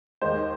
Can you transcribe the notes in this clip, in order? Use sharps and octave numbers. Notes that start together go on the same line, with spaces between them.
D#2 D#3 G#3 C5